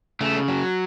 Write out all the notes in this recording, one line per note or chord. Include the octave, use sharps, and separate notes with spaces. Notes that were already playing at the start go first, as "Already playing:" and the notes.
C#3 A3
F#3